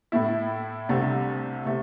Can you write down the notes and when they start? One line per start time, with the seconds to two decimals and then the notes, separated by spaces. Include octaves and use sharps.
0.12 A2 A3 E4
0.89 C2 C3 A3 D4
1.65 C3 A3